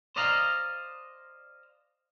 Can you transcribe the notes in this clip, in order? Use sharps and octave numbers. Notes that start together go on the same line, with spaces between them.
C5 D5 D#5 F5 A#5